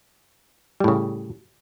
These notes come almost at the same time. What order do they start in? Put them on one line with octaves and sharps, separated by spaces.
G3 A2 C#3